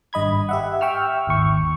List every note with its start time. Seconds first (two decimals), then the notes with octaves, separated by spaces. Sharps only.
0.13 G#1 G2 D#5 B5 G#6
0.49 G4 E5 F#5
0.81 E5 G5 C#6 E6 F6
1.27 G#1 D#2 C#6